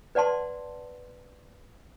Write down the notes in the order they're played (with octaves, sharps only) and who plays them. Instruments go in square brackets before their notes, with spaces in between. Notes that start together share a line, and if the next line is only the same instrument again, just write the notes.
[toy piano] B4 D5 F#5 A5 C6